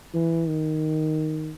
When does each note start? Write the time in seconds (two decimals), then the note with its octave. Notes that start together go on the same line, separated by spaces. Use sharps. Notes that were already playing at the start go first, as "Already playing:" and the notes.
0.14 E3
0.48 D#3